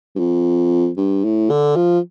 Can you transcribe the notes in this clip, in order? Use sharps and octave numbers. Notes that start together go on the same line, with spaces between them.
G2
F2
G2
A2
D3
F3